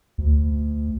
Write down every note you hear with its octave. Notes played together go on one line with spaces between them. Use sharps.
D2